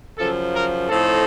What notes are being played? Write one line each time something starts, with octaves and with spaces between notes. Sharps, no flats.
F#2 C#3 F3 A4
A#4
A2 F3 C4 D#4 A4